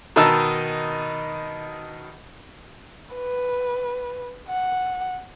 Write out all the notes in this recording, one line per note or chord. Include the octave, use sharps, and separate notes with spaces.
B2 D#3 D#4 A5 E6
B4
F#5